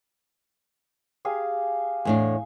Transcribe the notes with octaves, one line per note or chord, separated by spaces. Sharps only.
G4 G#4 F5
E2 A2 D4 G#5